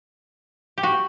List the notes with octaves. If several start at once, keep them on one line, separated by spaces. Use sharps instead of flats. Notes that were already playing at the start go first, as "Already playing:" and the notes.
G4
F#4